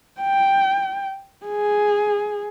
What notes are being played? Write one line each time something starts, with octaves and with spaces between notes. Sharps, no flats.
G5
G#4